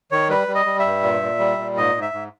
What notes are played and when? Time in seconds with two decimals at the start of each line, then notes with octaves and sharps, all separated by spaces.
0.11 D#3 C#5
0.29 G3 B4
0.47 G3
0.55 D#5
0.66 G3
0.79 E5
0.85 G2
1.03 A#2
1.22 A#2
1.39 G3
1.58 A#2
1.77 G#2 D#5
1.95 G#2
2.02 E5
2.14 G#2